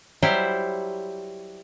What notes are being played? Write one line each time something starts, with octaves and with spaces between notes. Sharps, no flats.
F#3 G3 E4 G4 C5